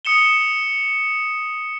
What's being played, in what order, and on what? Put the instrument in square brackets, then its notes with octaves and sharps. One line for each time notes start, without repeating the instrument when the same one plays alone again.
[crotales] D#6 C#7 E7 G7